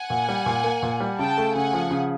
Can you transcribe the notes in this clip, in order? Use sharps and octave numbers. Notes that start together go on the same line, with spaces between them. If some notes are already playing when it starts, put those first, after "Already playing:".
Already playing: F#5 G#5
A#2
G3
A#2
A#3
A#2
G3
C#3 G5 A5
A3
C#3 F#5 G#5
F3
C#3